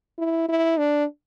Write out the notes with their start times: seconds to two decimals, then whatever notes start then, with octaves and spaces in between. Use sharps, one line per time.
0.18 E4
0.49 E4
0.78 D4